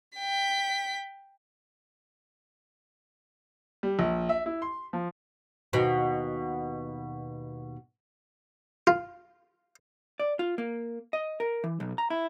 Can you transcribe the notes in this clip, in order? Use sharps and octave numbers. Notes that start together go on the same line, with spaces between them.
G5 B6
G3
A#1
E5
E4
C6
F3
D#2 B2
F4
D5
F4
A#3
D#5
A#4
E3
B1
A#5
E4